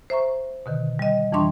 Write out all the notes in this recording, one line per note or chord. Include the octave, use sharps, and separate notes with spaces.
C5 E5 A#5 C#6
B2 D3 D#3
G3 D#5
F2 E3 G3 D4 C6 C#6